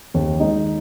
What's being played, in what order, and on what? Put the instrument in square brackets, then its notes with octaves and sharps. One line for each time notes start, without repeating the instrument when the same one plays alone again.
[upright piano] D#2
G#3 D#4